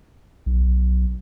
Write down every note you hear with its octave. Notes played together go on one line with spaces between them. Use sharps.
B1